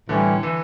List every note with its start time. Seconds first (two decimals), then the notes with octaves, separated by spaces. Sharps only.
0.09 A2 D3 E3 G3 C#4 G4
0.43 E3